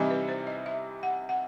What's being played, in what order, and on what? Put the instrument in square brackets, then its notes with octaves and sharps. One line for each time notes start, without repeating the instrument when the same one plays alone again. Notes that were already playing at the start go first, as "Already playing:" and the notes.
Already playing: [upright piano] C3 E3 G3 D#4
[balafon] B4
C5
D#5
E5
F#5
F#5